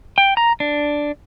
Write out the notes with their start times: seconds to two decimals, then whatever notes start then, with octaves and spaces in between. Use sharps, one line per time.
0.18 G5
0.37 A#5
0.60 D4